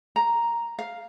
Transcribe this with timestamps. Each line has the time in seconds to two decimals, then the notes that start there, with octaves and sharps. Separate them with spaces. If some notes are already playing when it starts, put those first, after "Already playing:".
0.16 A#5
0.79 F5